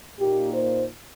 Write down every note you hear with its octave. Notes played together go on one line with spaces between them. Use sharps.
A#2 A#3 D#4 G4
C5